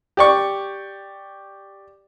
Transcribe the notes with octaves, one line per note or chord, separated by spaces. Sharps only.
G4 D5 C#6